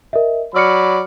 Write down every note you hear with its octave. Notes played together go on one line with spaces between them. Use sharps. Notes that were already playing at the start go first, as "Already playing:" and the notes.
A#4 D#5 E5
F#3 D5 B5 E6 F6 C#7